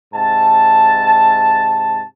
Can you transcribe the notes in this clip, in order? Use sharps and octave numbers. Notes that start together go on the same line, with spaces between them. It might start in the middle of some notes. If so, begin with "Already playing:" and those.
G#2 C3 A5